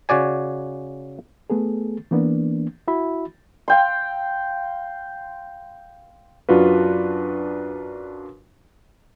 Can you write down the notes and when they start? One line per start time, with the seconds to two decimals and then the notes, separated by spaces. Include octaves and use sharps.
0.09 C#3 F#4 D5 G#5
1.50 A3 B3 G#4 A4
2.11 E3 A#3 B3 D4
2.88 E4 F#4 E5 B5
3.68 F5 G5 C6
6.49 F#2 D4 F4 F#4 B4